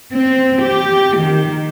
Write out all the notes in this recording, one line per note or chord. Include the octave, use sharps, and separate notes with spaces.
C4
G4
D#3